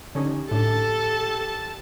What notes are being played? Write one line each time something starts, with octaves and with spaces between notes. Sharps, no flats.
D3 C#4 D#4 G4
A2 D4 A4 A5